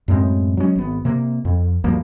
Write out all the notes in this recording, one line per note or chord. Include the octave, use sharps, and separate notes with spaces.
F#2 A2 G#3 C4
F#3 G#3 C#4
G#1 B3
C3 A#3
F2
D2 G2 F3 A#3